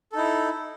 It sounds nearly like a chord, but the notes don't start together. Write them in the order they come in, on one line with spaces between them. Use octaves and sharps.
A4 D#4 E4